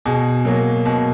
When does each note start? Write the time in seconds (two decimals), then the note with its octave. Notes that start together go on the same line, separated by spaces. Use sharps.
0.05 B2 G#4
0.45 F#3 A#3
0.85 B2